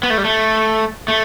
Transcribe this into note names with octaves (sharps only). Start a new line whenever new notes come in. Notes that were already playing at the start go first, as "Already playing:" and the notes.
B3
A3
G3
A3
A3